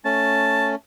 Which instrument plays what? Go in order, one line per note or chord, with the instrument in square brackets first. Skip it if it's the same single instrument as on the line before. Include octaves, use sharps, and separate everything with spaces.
[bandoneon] A3 C#4 [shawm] A5